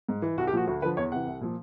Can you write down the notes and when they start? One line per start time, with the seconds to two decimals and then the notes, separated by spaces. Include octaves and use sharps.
0.09 G#2
0.22 E3
0.37 C2 F#4
0.47 G4
0.53 A#2 F3 F#4
0.67 D2 F#4
0.82 D3 B4
0.85 F3
0.97 E2 C#5
1.12 C3 E3 F#5
1.27 C2
1.41 A#2 F3